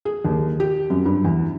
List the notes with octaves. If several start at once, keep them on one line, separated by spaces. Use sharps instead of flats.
G#4
D#2
G4
F#2
G2
E2